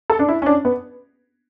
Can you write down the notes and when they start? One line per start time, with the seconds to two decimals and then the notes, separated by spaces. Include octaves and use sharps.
0.10 A4
0.19 D4
0.29 E4
0.42 C#4
0.46 D4
0.65 B3